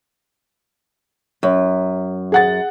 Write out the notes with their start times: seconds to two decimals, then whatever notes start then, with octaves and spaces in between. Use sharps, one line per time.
1.43 F#2
2.32 G#4 F#5 A6